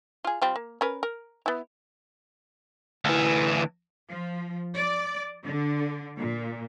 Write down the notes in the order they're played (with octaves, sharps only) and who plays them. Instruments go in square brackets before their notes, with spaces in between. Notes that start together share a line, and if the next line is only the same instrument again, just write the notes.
[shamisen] F4 G#4
G3 C4 F4
A#3
C#4 A#4 B4
A#4
B3 E4
[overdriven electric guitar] D2 E3
[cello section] F3
D5
D3
A#2